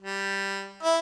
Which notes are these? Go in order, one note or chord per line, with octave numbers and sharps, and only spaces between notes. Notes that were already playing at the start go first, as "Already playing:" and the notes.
G3
E4